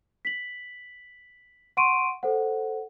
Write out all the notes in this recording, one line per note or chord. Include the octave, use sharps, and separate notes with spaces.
B6 F#7
F#5 C6 C#6 D7 D#7
A4 C5 F#5